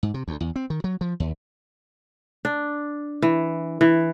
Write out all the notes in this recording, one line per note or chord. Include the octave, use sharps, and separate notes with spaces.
G#2
C3
D2
E2
C4
D#3
F#3
F3
D#2
D4
E3
E3